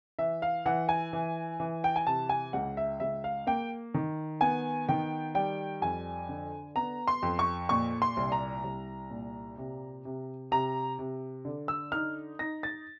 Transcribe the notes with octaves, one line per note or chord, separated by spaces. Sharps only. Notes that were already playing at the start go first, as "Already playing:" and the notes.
E3 E5
F5
E3 F#5
G#5
E3
E3
G5
G#5
C3 A5
G#5
C#2 F#5
E5
C#2 E5
F5
A#3 G5
D#3
B3 G#5
D#3 G5
G3 G5
F2 G#5
D3
B3 A#5
C6
F2
C#6
A#2 C#6
C6
C2
A#5
C2
A#2
C3
C3
C3 A#5
C3
D3
E6
D#4 F6
D#4 A#6
A6